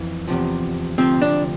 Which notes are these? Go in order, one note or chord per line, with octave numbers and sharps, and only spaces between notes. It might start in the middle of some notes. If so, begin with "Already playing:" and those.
Already playing: F2 E3
E2 C3 F3
D2 C3 F3 C4
D4